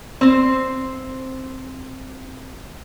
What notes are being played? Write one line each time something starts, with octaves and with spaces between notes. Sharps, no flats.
C4 C5